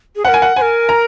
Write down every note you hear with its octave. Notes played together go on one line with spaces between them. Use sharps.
G#4
A#4 C5 F#5
G#5
F#5
C5 G#5
A#4
A#5